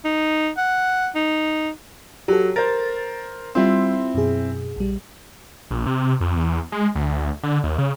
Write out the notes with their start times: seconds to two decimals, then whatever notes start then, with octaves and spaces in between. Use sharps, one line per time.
0.04 D#4
0.57 F#5
1.15 D#4
2.28 F#3 G4 A4
2.56 A#4 C5 A6
3.55 G3 C4 E4 F4 C6
4.14 F#2 B2 G#4
4.76 A#1 G3
5.71 A#1
5.86 C3
6.21 F2
6.36 E2
6.72 G#3
6.95 D2
7.43 D3
7.64 D#2
7.78 C#3